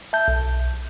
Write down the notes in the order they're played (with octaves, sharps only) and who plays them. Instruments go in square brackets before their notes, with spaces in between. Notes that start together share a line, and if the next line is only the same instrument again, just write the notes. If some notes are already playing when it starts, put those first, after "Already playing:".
[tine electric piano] E5 A5 G6
B1